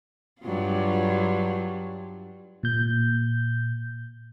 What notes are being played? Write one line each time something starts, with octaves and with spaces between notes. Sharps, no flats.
G2 F#3 F4
A#2 G6